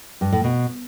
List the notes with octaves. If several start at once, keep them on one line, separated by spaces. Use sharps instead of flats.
G2
A2
B2